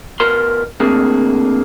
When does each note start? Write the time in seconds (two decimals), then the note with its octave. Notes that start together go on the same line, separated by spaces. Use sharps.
0.20 B2 A#4 C6
0.80 D3 A3 A#3 C4 G#4